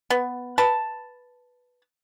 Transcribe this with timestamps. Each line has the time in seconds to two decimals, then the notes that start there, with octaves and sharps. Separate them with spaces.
0.10 B3
0.58 B4 A5